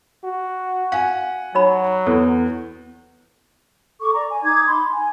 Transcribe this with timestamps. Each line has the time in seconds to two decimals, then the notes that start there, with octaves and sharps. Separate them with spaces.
0.24 F#4
0.92 F5 F#5 G#5
1.55 F#3 D#4 C#5 B5
2.07 E2 A4
4.00 A4 C#6 D6
4.13 D5 A#5
4.30 G#5
4.43 D#4 D6 G#6
4.67 B5 C6
4.90 G#5